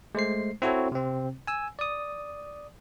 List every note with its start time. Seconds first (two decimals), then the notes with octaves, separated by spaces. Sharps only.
0.15 G#3 A3 C5 C7
0.62 C4 E4 F#4 A4 C#5
0.92 C3 C4
1.47 G#5 E6
1.79 D5 D#6